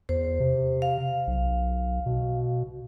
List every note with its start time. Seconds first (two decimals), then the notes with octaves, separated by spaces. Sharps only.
0.09 E2 C5
0.40 C3
0.82 F5
1.27 B1
2.06 B2